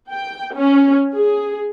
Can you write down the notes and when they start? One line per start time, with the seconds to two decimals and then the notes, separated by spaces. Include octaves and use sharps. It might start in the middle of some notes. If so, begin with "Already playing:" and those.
0.13 G5
0.56 C#4
1.15 G#4